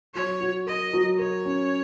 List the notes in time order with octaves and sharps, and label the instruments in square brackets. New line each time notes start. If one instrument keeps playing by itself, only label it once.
[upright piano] F#3 [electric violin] C#5
[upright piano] F#4
[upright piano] A#4 [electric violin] D#5
[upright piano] F#3
[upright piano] A#4 [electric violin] C#5
[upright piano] C#4